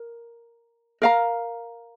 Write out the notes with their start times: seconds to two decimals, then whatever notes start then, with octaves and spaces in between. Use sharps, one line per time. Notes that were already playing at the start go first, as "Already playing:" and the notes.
Already playing: A#4
1.02 A#4 F5 A#5